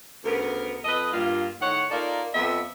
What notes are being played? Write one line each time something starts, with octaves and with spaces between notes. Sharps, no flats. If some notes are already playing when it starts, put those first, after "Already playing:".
D2 C#3 B3 A#4
F2 A4 B4 D#5
G2 A#3 F4
A2 D#3 C#5 F#5
A#3 D#4 F4 A4 A#4 D5
F2 B3 E5